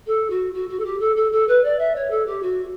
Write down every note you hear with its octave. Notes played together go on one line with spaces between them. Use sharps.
A4
F#4
F#4
F#4
A4
G4
A4
A4
A4
B4
D5
E5
C#5
A4
G4
F#4